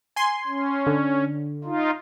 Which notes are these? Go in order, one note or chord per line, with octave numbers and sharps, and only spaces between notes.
G#5 C6
C#4
D3
D#4 F4